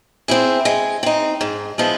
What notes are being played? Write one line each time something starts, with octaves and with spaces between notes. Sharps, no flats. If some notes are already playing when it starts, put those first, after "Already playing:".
C4 E4 G#4
G#3
C4 D#4
G#2
F3 G#3 B3 E4